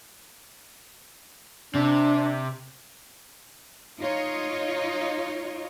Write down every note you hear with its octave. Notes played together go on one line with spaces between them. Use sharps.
C3 D4
D#4 F4 C#5 D#5